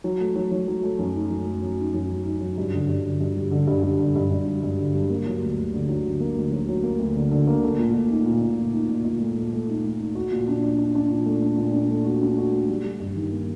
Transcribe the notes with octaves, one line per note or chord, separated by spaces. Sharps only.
F#3
A3
F#3
F#3
F#3
A3
F#2
D#4
F#3
A3
F#3
D#4
F#2
F#3
D#4
F#3
G2
D3
G2
D3
G2
G3
D3
G2
G2
D3
G2
G2
G3
G2
D3
G3
A#3
F#3
D2
D2
D3
F#3
D3
A#3
D2
F#3
F#3
A#3
D2
D3
D3
A#3
A3
A#2
A#2
D#4
A#2
A#2
A#2
D#4
A#2
A#2
A3
A3
A3
D#4
A3
D#4
F#4
A#2
D4
D4
D4
D4
A#2
A3
D4
A#2
D4
A3
F#4
D4
F#4
A3
G3
G3
G2
D#3
A#3